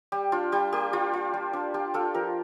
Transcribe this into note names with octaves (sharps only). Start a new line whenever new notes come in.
G3 G4
D4 F4
G3 G4
A#3 G4
G3 F4
F4
G3
D4
F4 G4
D4 F4 A4
F3 G4 A#4